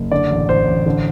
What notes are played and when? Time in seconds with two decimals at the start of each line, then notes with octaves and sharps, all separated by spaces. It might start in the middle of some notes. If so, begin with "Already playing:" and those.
Already playing: F#1
0.12 D3 D5
0.30 A1
0.49 A1 C5
0.67 A1
0.86 D3